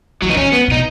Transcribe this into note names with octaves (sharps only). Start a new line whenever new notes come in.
E3 F#3
D#4
D#3 C#4
B3
B2 D#4